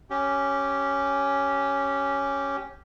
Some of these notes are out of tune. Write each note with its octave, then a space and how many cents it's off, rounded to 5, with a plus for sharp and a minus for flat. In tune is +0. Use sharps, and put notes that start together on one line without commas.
C#4 +0 G4 -10